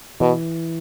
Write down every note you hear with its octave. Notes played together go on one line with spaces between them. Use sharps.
B2 E3